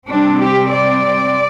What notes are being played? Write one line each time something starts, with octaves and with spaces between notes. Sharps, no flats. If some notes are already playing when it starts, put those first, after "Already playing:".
C3 G3 C4 D4
G4
D5